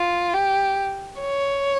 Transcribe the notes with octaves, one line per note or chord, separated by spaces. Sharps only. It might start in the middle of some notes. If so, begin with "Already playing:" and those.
Already playing: F4
G4
C#5